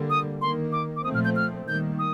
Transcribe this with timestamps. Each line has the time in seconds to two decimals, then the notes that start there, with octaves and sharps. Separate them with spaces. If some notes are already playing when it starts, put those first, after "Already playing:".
Already playing: D3 G3 A#3
0.10 D#6
0.41 D#3 A#3 C6
0.72 D6
0.96 D6
1.04 A#2 F3 A3 C4 D#6
1.15 F6
1.25 G6
1.36 F6
1.67 D#3 G3 A#3 G6
1.99 D#6